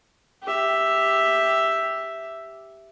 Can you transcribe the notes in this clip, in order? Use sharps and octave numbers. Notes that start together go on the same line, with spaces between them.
G4 E5